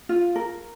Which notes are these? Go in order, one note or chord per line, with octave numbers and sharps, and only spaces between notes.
F4
A#4